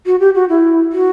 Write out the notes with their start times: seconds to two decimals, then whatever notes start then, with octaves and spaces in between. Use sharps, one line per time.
0.06 F#4
0.20 G4
0.35 F#4
0.49 E4
0.92 F#4